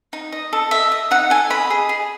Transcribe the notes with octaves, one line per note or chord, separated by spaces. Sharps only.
D#4
D#5
A4
D#5 E5
D#5
D#4 F#5
A4 G#5
D#5 B5
G#4
G#4